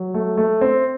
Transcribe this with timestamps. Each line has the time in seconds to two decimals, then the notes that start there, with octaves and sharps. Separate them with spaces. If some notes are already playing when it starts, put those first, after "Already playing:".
Already playing: F#3
0.14 A3
0.37 A3
0.61 C4